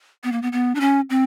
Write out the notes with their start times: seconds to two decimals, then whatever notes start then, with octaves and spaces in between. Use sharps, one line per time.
0.24 B3
0.32 A#3
0.42 B3
0.52 B3
0.75 D4
0.81 C#4
1.10 C4